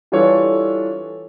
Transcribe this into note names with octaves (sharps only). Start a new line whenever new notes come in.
E3 G3 D4 F4 A4 C#5